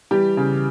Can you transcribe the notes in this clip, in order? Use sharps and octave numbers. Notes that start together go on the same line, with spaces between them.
E3 G3 G4
C#3